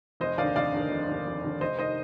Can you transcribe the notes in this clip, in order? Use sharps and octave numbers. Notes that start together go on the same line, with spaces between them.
F1 C5 D#5
D#2 D3 D5 F5
F1 D5 F5
D#2 D3
F1
D#2 D3
F1
D#2 D3
F1 C5 D#5
D#3 C5 D#5